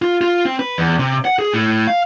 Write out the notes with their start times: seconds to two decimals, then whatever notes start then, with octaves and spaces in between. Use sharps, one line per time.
0.02 F4
0.21 F4
0.45 C4
0.59 B4
0.78 E2
0.99 C3
1.25 F#5
1.39 G#4
1.54 A2
1.87 F5